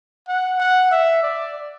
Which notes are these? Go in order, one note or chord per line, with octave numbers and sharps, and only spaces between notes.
F#5
F#5
E5
D5